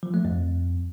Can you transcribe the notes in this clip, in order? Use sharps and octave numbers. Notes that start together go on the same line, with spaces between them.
F3
A3
F2